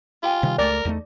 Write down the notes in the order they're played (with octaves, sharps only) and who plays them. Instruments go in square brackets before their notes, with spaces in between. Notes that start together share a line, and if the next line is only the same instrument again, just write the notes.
[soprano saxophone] F4 [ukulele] G4 G5 G#5
[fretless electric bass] C3 D#3 G3
[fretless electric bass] C#2 G#3 A3 [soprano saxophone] A#4 [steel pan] D5
[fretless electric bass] E2 G3 A3 [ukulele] D#4 D#5